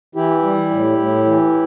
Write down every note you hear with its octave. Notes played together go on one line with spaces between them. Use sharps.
E3 E4 G4
G3
A2
A2
E3